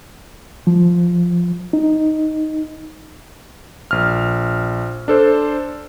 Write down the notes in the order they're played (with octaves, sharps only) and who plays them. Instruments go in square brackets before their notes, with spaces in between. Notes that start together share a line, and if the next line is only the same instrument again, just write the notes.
[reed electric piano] F3
D#4
[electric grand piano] A#1 F6
D4 A4 C5